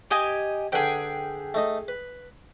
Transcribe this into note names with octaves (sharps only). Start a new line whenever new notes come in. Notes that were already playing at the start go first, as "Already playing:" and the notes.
G4 D#5 G#5
D3 G#4 B4 G5 C6
A3 D#4 D#5
B4